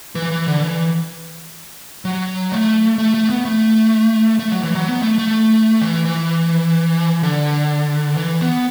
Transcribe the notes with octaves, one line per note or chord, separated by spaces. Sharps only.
E3
E3
D3
E3
F#3
A3
A3
A3
B3
A3
A3
F#3
E3
F#3
B3
A3
A3
E3
E3
D3
E3
B3